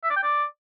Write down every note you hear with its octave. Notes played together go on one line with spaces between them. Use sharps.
E5
D5
G5
D5